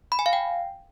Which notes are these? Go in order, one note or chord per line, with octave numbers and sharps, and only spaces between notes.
B5
G#5
F5
G5